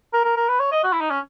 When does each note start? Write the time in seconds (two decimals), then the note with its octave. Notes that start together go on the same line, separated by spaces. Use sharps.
0.14 A#4
0.25 A#4
0.37 A#4
0.49 B4
0.60 C#5
0.72 D#5
0.84 F#4
0.93 E4
1.01 D#4
1.10 C#4